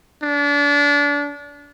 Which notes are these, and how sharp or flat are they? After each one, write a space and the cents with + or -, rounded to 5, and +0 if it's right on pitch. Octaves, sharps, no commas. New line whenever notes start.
D4 -30